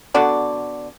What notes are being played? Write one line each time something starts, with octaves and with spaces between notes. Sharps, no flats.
D3 B3 F#4 D5